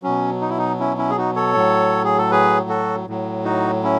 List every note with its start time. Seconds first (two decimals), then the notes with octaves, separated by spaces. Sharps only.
0.03 B2 F#3 C#4
0.41 D#4
0.50 E4
0.58 D#4
0.80 C#4 E4
0.98 C#4 E4
1.10 G#4
1.18 D#4 F#4
1.36 A4 C#5
1.55 A2 F#3
2.04 G#4
2.18 A4
2.31 G#4 B4
2.69 F#4 A4
3.08 A2 F#3
3.45 D#4 F#4
3.83 C#4 E4